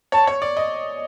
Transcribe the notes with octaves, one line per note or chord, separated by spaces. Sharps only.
C#5 A5
C#5
D5
D#5